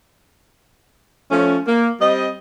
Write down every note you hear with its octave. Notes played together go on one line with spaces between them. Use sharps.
F3 A3 C#4
A#3
G3 C4 D#5